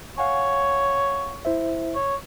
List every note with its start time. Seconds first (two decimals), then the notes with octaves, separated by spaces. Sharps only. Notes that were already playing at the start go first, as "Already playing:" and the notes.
0.18 C#5 F5 F#5 G#5
1.45 E4 C5 E5
1.95 C#5